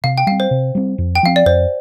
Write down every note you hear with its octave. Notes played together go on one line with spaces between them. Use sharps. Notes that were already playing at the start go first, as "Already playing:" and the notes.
C3 F5
G5
G3 C4 F5
C5
C3
G3 C4
F2
G5
F3 C4 F5
D5
F2 C5